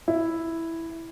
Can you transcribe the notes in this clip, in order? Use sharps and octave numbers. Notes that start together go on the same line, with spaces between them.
E4